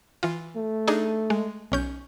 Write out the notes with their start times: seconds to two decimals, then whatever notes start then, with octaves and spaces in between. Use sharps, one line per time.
0.23 E3 F4
0.56 A3
0.88 D4 D#4 G#4
1.30 G#3
1.72 B1 C#4 G6